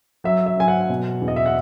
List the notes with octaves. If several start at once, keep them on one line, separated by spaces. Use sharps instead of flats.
F#3 E5
E5
F#3 G#5
F#5
B2
E2
D#5
E5
F#5